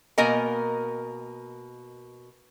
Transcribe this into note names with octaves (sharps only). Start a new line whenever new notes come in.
B2 A#3 A#4 D#5 G#5